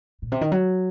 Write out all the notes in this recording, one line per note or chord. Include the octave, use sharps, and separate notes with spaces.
A#2
C3
D#3
F#3